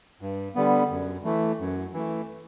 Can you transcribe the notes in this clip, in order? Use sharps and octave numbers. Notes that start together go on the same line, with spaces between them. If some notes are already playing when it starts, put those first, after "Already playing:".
G2
D3 G3 B3
F#2
E3 A3
F#2
E3 A3